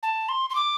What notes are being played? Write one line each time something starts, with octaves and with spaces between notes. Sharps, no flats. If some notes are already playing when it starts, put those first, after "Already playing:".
A5
C6
C6
D6